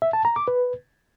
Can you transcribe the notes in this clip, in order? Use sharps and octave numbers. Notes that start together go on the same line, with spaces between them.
E5
A5
A#5
D6
B4